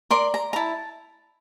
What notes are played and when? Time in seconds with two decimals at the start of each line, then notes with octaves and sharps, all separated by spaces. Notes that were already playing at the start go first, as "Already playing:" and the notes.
0.10 A#4 D5 C6
0.34 A#5
0.53 A#5
0.56 E4 A5